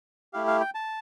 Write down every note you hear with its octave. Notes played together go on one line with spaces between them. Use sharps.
A3 E4 G4 F5
F5
G5
A5